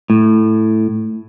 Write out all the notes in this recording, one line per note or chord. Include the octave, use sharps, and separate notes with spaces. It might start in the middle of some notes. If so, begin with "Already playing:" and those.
A2